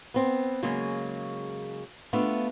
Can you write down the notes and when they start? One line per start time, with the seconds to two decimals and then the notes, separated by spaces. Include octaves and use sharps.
0.14 B3 C4
0.63 C#3 F#3 G#3 A#3
2.13 A3 B3 D4 F4